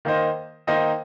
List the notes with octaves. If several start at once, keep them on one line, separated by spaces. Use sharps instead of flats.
D#3 A#3 D#4 C5 D#5
D#3 A#3 D#4 C5 D#5